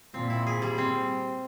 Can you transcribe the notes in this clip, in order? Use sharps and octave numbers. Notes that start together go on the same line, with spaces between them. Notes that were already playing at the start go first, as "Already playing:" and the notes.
A#2 C4
E4
G#4
G3
C4